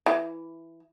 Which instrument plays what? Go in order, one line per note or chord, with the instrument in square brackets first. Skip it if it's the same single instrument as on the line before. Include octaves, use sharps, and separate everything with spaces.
[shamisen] E3